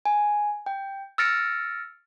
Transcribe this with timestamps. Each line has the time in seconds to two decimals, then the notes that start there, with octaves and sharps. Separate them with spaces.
0.05 G#5
0.66 G5
1.18 E6 F6 A6 A#6 C#7 D7